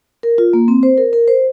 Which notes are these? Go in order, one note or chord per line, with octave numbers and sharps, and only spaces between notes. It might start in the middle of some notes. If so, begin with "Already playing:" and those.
A#4
F4
A#3
C4
C5
A#4
A#4
C5